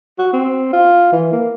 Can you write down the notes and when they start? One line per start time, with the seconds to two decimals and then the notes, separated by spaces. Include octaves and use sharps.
0.19 F#4
0.33 C4
0.73 F4
1.13 E3
1.32 A#3